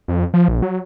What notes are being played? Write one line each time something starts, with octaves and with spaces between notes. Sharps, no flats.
F2
F3
A#1
F#3